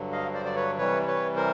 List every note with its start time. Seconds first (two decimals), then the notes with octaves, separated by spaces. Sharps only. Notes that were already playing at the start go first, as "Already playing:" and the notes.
Already playing: G2 D3 F#3
0.12 D#5 F5
0.34 C5 D5
0.45 D5
0.56 B4 C#5
0.78 C3 E3 G3 B4 C#5
1.07 B4 C#5
1.36 A#4 C5